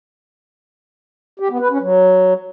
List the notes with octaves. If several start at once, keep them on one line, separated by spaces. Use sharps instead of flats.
G4
B3
B4
C#4
F#3